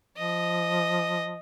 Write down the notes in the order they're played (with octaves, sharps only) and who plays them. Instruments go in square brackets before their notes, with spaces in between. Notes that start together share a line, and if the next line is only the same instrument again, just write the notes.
[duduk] F3 [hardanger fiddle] D#5